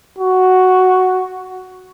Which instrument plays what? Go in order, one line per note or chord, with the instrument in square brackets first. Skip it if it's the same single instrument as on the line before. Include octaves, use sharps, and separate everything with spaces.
[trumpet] F#4